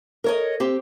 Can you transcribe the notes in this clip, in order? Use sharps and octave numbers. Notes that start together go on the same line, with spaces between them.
A#4 C#5 D#5
C4 G4